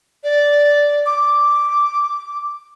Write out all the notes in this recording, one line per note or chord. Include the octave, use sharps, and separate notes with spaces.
D5
D6